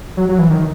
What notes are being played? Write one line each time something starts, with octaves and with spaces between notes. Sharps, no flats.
F#3
F#3
E3
D#3